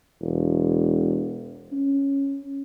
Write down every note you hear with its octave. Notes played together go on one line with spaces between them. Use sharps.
E1
C#4